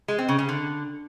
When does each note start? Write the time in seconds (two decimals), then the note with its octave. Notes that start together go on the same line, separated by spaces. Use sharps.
0.08 G#3
0.18 C4
0.28 C#3
0.39 C#3
0.49 D3